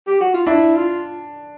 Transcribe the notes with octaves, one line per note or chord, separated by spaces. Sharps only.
G4
F#4
F4
D4 E4
F4